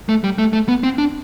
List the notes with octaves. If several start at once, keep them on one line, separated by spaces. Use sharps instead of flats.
A3
G3
A3
A3
B3
C4
D4